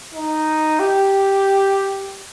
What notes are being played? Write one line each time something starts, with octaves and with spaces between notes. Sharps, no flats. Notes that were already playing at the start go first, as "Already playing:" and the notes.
D#4
G4